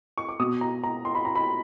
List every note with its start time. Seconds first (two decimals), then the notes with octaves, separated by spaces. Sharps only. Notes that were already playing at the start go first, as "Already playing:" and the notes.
0.18 C#6
0.29 D6
0.39 B2 D#6
0.61 A#5
0.84 A#5
1.05 C6
1.15 B5
1.25 A#5
1.35 B5